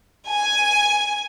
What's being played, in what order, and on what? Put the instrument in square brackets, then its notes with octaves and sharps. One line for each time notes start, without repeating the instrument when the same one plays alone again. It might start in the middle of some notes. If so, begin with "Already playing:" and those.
[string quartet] G#5